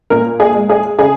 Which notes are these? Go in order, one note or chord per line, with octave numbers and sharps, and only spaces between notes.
A#2 A#4
G#4
G#3
G#4
C#3 G#4